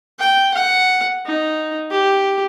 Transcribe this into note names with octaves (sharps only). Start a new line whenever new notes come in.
G5
F#5
D#4
G4